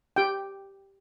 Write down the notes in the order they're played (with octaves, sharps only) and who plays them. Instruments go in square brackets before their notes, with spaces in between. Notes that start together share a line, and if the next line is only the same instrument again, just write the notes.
[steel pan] G4 G5